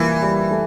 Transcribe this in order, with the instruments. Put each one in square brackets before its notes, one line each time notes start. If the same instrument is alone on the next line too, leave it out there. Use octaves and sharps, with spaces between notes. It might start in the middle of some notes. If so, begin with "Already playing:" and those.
Already playing: [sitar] E3 [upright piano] G3 A#3 F4
[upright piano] G3
A3